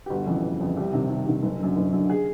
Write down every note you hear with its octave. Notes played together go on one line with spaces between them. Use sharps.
G4
G1 F#4
F2 C#3 E3
G1
F2 C#3 E3
C2 G4
C3 D#3
C2
C3 D#3
F#1
F#2 D3
F#1
F#2 D3
G#4